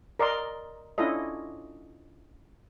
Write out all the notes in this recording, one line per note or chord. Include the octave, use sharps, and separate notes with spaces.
A#4 D5 D#5 C6
C#4 D4 E4 F4 A4 D#5